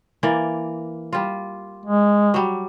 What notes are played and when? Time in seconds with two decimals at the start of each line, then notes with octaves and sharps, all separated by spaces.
0.23 E3 A#3 D5
1.13 G3 F4
1.86 G#3
2.34 F#3 G3